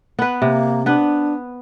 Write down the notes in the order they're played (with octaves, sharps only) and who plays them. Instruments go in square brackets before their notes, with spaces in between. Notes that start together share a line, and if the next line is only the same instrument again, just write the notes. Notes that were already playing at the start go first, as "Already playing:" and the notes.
[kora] B3 B4
[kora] C3 [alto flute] A#3
[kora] B3 B4 [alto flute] D4